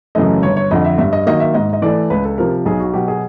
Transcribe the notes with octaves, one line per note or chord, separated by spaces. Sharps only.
F#2 C#3 E3 A3 D#5
G1 C#5
C#5
F2 D3 D#5
E5
G2 E5
D#5
D#3 F#3 A#3 D#5
E5
G#2 D#5
D#5
E3 A3 D5
C#2 B4
A4
C3 F3 A#4
B1 G#4
F#4
B2 F#3 G4
G#4